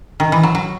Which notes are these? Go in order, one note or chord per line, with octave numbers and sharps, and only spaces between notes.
D#3
E3
F#3
F#3